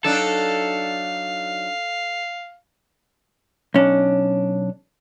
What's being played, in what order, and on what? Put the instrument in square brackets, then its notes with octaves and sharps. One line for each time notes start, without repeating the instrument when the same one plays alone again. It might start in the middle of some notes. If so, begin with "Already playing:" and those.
[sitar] F#3 D4 D#4 [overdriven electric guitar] A4 [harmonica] F5
[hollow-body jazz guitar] B1 C#4 D4